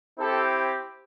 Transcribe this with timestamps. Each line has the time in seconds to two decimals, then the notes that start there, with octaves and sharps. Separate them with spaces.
0.18 C4 E4 G4 A4